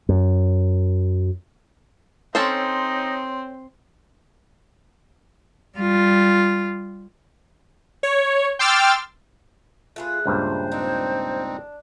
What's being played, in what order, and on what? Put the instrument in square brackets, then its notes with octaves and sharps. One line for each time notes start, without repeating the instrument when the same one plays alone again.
[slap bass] F#2
[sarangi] C4 [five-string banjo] C#4 A4 C5 [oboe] D#4 [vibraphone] C#5 C6
[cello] G3 F4
[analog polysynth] C#5
G5 C6 D6 E6 F6 A6
[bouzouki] A3 G#4 B4 [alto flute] F4
[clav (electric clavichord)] C#2 G2 A#2 [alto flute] C5
[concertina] C4 D#4 [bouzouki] D4